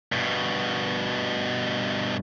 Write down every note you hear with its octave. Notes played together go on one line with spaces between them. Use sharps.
G2 B2